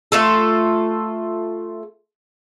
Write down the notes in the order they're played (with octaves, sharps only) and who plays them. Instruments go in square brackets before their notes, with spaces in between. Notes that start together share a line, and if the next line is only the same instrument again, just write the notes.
[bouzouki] A3 F4 A4